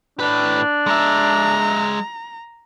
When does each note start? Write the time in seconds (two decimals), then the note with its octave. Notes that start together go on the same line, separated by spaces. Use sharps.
0.20 A2 D4 B4
0.87 G#3 E5 A#5